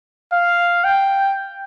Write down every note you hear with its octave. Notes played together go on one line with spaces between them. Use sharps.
F5
G5